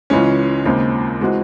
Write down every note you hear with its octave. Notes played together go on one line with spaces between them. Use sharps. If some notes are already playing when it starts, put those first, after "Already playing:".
C#2 C#3 E3 G#3 C#4
D#2 C#3 G#3 C4
E3 G#3 C4 F#4